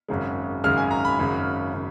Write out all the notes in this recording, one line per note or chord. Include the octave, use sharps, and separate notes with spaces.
G#1 F#2 C#3 G#3
G#1 F#2 C#3 G#3 F6
G#5
A#5
B5
G#1 F#2 C#3
C#3